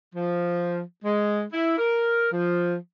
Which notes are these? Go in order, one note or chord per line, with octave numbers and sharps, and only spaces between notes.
F3
G#3
E4
A#4
F3